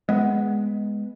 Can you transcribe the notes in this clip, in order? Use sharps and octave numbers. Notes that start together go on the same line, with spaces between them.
G#3 B3